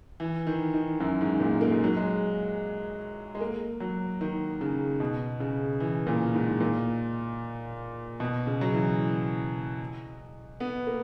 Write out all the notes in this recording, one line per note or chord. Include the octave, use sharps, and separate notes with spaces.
E3
D#3
D#3
F#2
G#2
A#2
A#3
G#3
F#3
G#3
G#3
A#3
F#3
D#3
C#3
B2
C#3
E3
A#2
G#2
A#2
B2
C#3
F#3
E3
B3
A#3